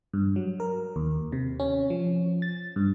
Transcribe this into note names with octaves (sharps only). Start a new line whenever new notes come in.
G2
F#3
A#4
D#2
C3
C#4
F3
A6
G2